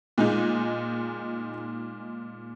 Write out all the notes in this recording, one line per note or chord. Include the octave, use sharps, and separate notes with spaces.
A#2 G#3 D#4